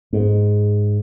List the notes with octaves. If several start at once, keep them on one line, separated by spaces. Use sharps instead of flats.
G#2